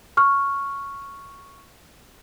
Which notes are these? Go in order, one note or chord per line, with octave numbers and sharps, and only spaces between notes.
C#6 F6